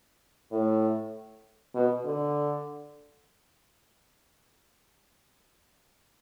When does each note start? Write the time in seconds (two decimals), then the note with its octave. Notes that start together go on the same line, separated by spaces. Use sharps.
0.52 A2
1.75 B2
2.05 D3